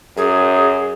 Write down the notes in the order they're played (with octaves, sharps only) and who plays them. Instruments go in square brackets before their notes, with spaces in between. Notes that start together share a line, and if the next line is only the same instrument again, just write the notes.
[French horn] F#2 [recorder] G#4